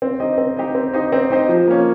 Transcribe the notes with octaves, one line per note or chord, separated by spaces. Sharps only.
C4
D#4 G4 C5 D#5
C4
D#4 G4 C5 D#5
C4
D#4 G4 C5 D#5
C4
D#4 G4 C5 D#5
F3
A#3 C#4